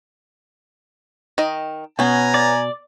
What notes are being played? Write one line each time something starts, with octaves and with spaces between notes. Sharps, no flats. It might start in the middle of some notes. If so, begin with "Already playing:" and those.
D#3 D#5
B2 B3 C#4 G#5 A#5
D5